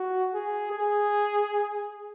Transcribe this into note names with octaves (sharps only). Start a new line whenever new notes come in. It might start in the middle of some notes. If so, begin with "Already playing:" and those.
Already playing: F#4
G#4
G#4